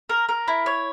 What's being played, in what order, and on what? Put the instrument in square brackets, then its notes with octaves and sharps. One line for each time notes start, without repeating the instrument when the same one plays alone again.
[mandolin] A#4
A#4
E4
C#5